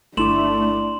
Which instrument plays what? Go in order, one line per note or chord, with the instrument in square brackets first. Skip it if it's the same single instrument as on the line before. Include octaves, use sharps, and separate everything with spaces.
[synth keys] G1 E4 D6 [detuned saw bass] A3 [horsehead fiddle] D4 [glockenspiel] C6 E7 F#7